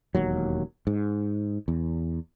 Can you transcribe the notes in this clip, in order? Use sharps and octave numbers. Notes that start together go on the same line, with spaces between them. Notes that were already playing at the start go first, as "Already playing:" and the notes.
E1 D#2 F#3
G#2
E2